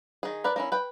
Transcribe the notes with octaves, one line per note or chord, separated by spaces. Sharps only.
D#3 G#4
A#4 B4 D5
A#3 C#4 E4
B4 G5